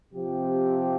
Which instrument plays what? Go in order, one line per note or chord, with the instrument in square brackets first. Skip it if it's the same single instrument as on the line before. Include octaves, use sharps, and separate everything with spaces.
[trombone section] C3 F3 C4 G4